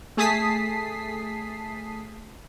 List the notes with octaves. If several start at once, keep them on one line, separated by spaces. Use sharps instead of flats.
A3 G#4 A5 D#6 B6 C7